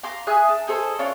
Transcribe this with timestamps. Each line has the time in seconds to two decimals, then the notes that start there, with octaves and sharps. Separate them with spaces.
0.03 F5 A#5 C6 D6
0.27 G#4 E5 G#5 F#6
0.48 D4
0.67 D#4 G#4 A4 C5
0.99 C#4 D4 F4 C#5